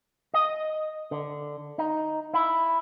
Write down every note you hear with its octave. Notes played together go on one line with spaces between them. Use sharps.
D#5
D3
D#4
E4